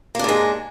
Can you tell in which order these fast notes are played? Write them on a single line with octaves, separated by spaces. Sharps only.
A#3 D4 G#2 G#3